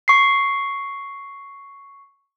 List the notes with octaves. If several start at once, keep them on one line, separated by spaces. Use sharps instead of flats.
C#6 C7